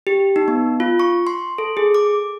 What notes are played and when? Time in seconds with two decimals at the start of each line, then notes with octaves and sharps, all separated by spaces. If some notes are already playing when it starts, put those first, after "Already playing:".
0.07 G4
0.36 D#4
0.48 B3
0.80 F4
1.00 C#6
1.27 C6
1.58 A4
1.77 G#4
1.95 D6